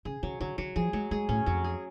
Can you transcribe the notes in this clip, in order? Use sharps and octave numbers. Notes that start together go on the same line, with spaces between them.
C#3 G#4
C#3 F#3
D3 F#3
D3 F#3
F3 G#4
F#3 G#3
G#3 G#4
A2 C#4
F2 F#3
G#4